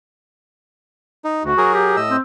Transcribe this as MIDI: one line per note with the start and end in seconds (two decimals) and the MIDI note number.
1.25 1.43 63
1.44 1.54 38
1.44 1.73 66
1.58 1.97 54
1.58 1.97 68
1.58 1.97 70
1.74 1.99 67
1.97 2.17 45
1.97 2.17 75
1.97 2.17 88
2.11 2.20 60